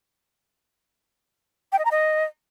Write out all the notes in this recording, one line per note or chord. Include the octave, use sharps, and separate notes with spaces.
G5
D#5
A#5
D#5